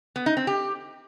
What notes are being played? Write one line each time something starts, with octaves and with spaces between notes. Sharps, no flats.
B3
D#4
C4
G4